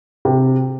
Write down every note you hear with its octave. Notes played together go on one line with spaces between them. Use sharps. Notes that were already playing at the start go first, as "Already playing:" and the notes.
C3